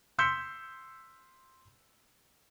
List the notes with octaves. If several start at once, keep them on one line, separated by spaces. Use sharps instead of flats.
C6 E6 G6 B6 C#7